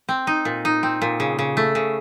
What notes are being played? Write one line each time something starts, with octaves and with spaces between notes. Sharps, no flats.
C4
D#4
A#2
D#4
C4
A#2
C#3
C#3
A3
C#3